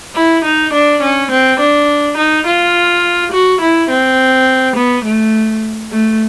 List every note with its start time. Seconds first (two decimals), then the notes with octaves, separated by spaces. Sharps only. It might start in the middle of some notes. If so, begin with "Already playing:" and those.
0.16 E4
0.45 D#4
0.73 D4
1.02 C#4
1.31 C4
1.60 D4
2.17 D#4
2.46 F4
3.32 F#4
3.61 E4
3.90 C4
4.76 B3
5.05 A3
5.92 A3